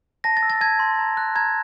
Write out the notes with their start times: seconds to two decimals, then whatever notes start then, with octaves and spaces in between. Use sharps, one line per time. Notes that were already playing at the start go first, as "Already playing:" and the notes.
0.24 A5 A#6
0.37 A6
0.43 E6
0.50 A6
0.61 A5 G#6
0.79 C6
0.99 A#5
1.17 F#6
1.35 A#5 G#6